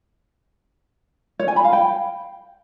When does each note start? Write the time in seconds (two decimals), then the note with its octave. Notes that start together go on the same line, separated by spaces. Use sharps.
1.39 C#5
1.48 G#5
1.56 B5
1.64 F5
1.73 G5